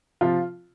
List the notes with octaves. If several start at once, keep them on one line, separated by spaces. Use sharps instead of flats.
C3 F3 F4